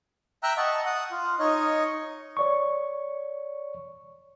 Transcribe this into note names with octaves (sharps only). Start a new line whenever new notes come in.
E5 G5 A#5 E6 F#6
D#5 F#5 A5 C#6
F#5 D#6
F4
D#4 C#5 D#5 C#6
C#5 D5 C#6